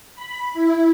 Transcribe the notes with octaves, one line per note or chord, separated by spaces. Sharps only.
B5
E4